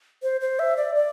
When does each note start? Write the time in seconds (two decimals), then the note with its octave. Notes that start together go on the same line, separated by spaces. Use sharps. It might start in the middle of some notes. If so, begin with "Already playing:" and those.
0.23 C5
0.41 C5
0.59 E5
0.77 D5
0.95 D5